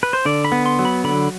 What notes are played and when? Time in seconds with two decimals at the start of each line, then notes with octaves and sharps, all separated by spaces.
0.03 B4
0.13 C5
0.25 D3 D5
0.45 B5
0.52 B3
0.66 C6
0.79 F#3
0.85 B5
1.04 D3 B5